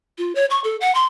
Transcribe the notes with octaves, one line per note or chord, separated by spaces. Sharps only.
F4
C#5
C#6
A4
F#5
C6